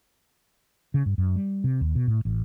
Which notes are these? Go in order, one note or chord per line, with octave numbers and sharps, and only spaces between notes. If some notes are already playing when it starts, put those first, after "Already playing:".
C#3
G2
F#2
G3
C3
D#2
B2
A2
A1